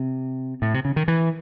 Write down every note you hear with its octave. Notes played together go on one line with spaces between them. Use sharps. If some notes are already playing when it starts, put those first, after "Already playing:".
Already playing: C3
A2
C3
C#3
D#3
E3